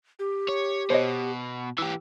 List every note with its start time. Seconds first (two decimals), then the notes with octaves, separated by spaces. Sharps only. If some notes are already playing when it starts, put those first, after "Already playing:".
0.19 G4
0.49 C#5
0.90 B2 C5 C#5 D#5
1.78 E3 G4 E6